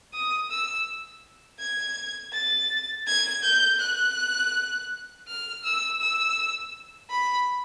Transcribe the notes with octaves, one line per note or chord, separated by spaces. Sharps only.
D#6
E6
G#6
A6
G#6
G6
F#6
F6
E6
E6
B5